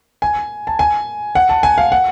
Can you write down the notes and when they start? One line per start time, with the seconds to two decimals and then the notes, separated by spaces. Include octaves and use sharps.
0.22 G#5
0.67 A5
0.79 G#5
1.35 F#5
1.49 A5
1.63 G#5
1.78 F5
1.92 F#5